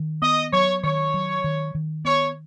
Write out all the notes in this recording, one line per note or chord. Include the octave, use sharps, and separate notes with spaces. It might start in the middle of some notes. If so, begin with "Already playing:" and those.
Already playing: D#3
B3 D#5
F#3 C#5
D#3 C#5
F#3
D#3
D#3
B3 C#5